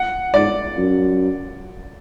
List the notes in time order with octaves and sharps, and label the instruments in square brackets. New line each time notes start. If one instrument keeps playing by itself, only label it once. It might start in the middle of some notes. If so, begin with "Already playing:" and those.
Already playing: [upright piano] F#5
[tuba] G#2 [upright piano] D5
[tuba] F#2